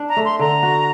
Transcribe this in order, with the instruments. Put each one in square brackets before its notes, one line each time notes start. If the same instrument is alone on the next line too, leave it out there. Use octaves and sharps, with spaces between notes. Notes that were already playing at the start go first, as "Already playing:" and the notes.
Already playing: [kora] D4
[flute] A#5
[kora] A3
[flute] C6
[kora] D3 [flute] A#5
[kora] F#4